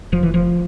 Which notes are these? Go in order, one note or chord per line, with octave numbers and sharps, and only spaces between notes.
F1 F3
E3
F3